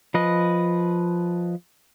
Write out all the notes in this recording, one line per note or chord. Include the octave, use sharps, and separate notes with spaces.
F3 B4 D#5